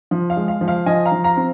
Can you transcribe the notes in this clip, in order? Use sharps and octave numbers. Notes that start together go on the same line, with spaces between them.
F3
F5
G#3
F5
F3
F5
F3 D#5 G#5
F5 A#5
F3
F5 A#5
C4